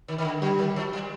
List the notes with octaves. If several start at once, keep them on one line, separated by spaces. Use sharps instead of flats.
D#3
D#3
D3
D3 G3
D#3
F3
G3